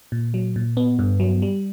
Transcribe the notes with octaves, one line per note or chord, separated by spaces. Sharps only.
A#2
F#3
A#2
B3
G2
F#3
G3